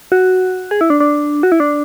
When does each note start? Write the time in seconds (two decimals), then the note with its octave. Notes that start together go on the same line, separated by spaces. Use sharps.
0.12 F#4
0.71 G#4
0.81 E4
0.90 D4
1.00 D4
1.43 F#4
1.52 E4
1.60 D4